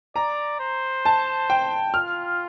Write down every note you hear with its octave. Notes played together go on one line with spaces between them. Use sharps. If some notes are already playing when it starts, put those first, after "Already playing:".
D5 A#5
C5
A5
G5
F4 F6